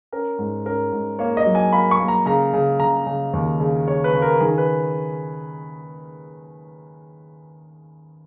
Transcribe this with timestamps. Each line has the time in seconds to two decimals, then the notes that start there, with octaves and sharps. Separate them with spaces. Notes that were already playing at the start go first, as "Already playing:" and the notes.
0.12 C#4 A#4
0.38 G#2
0.66 C#4 A#4
0.92 G#2
1.19 A#3 C#5
1.37 D#5
1.46 F#3
1.55 G#5
1.73 A#3 B5
1.91 C#6
2.00 A#3
2.08 A#5
2.26 C#3 A#5
2.53 C#3
2.80 C#3 A#5
3.07 C#3
3.33 D#2
3.60 C#3
3.87 C#3 C#5
4.04 B4
4.13 C#3
4.22 A#4
4.40 D#3 G#4
4.58 B4